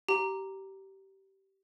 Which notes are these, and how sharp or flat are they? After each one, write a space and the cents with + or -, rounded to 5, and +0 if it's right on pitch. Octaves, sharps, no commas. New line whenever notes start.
G4 -20 A#5 +0